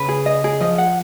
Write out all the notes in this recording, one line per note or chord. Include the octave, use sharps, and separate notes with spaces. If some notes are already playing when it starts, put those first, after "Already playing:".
Already playing: C#3 B4
G#4
D#5
G#4
F3 D#5
F#5